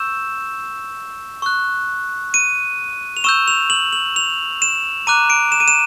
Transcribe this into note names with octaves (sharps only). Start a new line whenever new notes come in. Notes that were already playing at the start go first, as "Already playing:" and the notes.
Already playing: C#6 E6 G6 E7
C#6 F#6
D#7
F7
C#6 E6 G6 E7
F7
F#7
F#7
F7
E7
A#5 D6 F#6 D#7
D7
E7
D#7
E7